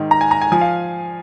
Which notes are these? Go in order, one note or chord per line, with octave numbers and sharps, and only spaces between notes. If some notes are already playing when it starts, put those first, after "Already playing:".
Already playing: G#2 D#3
A#5
G#5
A#5
G#5
F3 G#5
F5